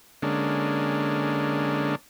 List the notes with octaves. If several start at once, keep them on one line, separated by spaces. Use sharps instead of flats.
D3 G#3 A#3 C#4 D4